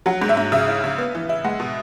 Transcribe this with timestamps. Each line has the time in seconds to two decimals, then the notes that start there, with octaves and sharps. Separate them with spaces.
0.06 F#3 F#5
0.22 G#2
0.29 E5
0.37 G#2
0.52 C#3 E5
0.68 E4
0.84 C#3
0.98 B3
1.15 E3
1.29 E4
1.44 G#3 F#5
1.60 B2